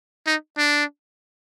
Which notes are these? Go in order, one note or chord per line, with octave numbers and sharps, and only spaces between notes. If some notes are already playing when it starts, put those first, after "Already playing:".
D#4
D4